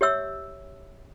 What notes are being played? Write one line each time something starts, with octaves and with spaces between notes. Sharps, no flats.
G4 C#5 E5 E6